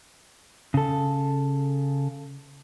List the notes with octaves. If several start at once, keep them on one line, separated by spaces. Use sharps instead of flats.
C#3 A4